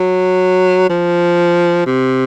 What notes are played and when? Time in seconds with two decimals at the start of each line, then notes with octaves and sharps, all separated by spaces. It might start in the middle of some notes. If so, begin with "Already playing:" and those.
Already playing: F#3
0.89 F3
1.86 C3